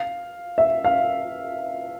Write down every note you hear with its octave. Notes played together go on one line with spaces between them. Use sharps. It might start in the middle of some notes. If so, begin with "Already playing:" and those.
Already playing: F5
E5
F5